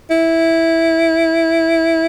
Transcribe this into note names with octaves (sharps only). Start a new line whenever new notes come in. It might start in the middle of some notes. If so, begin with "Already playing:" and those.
E4